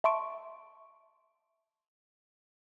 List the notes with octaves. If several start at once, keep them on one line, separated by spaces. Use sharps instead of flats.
E5 A5 C6 C#6 D7